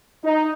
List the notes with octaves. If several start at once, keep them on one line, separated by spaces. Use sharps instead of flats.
D#4